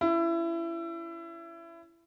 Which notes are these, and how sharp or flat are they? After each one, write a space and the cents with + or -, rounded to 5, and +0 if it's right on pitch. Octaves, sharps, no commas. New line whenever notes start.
C#4 +30 E4 +25